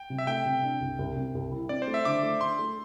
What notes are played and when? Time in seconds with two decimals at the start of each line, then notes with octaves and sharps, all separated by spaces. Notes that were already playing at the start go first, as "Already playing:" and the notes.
Already playing: G5
0.10 C3
0.18 E5
0.27 A3 G5
0.45 C3
0.63 D4
0.80 C2
0.99 C2
1.16 C3
1.35 C2
1.51 E4
1.69 C4 D5
1.82 C5
1.87 A3
1.94 E5
2.05 D3 D6
2.23 A3
2.41 D4 C6
2.59 A3